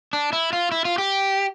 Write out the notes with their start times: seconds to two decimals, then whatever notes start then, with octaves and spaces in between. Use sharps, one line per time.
0.13 D4
0.33 E4
0.53 F4
0.72 E4
0.85 F4
0.98 G4